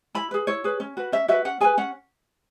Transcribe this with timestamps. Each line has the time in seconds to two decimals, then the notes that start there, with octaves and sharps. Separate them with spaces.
0.15 E4 B5
0.31 G#4 B4
0.47 E4 C#5
0.64 G#4 B4
0.80 C#4
0.97 F#4 B4
1.12 C#4 E5
1.28 F#4 B4 E5
1.45 C#4 F#5
1.60 G#4 B4 G#5
1.77 C#4 F#5